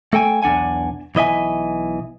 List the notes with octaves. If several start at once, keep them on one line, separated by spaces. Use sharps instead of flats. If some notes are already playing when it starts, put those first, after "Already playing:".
A3 A4 G5 G#5
B1 E2 D4 F#5 G#5
B1 E3 D#5 E5 G#5